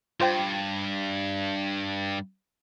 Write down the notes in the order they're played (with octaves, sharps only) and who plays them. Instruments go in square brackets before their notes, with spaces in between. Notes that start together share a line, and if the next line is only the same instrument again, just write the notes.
[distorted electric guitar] G2 [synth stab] F4 C5 G5